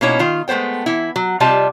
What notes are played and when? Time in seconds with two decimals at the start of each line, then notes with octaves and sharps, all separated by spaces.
0.01 B2 A#3 C#4 D#4 E4 C#5
0.19 D#3 F4
0.48 G#3 A3 B3 C5 G5
0.86 E3 E4
1.16 F#3
1.40 C3 G3 F4 D#5 A5